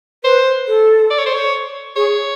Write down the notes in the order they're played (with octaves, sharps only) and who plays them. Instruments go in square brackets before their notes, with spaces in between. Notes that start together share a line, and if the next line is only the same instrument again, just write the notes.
[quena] B4 [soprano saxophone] C5
[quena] A4
[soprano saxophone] D5
C#5
C5
C#5
[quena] G#4 [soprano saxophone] C#5